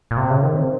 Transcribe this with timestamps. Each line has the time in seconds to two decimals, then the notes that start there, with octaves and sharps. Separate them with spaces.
0.11 A#2
0.17 C3
0.30 C#3
0.43 D#3
0.55 C4